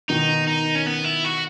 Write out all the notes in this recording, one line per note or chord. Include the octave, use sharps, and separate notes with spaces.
B2 D#3 D#4
D#4
C#4
B3
E4
F#4